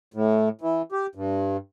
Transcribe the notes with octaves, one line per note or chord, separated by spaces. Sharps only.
A2
E3
G4
G2